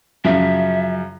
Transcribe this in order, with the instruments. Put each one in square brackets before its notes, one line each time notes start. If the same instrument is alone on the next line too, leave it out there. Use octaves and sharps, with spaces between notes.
[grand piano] F#2 C#3 F3 [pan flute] E5